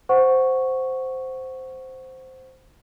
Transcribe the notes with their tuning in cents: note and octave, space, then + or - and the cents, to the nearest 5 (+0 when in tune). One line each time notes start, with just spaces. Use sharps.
C5 -5 F#5 +0 C#6 +0